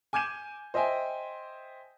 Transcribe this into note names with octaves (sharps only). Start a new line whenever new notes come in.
G#5 D6 G6 G#6 D#7 E7
C5 D#5 E5 G5 G#5